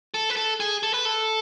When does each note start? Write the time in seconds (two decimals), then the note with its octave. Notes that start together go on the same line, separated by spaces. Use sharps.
0.14 A4
0.30 B4
0.37 A4
0.60 G#4
0.83 A4
0.94 B4
1.05 A4